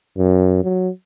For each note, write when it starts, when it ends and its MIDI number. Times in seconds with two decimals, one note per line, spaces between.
0.18 0.60 42
0.64 0.89 54